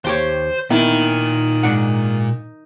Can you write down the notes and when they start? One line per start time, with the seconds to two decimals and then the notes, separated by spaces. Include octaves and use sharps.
0.05 D#2 G4 C5 C#5
0.70 A#2 D#3 B3 E4
1.63 G#2 D4 F#5